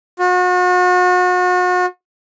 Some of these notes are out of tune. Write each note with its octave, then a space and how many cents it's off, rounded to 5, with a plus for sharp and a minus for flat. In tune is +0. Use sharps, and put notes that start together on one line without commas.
F#4 -40